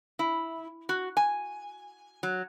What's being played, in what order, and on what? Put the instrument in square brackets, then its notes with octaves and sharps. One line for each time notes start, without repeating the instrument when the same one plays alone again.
[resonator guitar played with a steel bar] E4
F#4
G#5
F#3